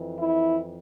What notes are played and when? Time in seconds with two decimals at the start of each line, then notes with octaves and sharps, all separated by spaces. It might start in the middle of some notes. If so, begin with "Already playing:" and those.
Already playing: F2 E3
0.19 E4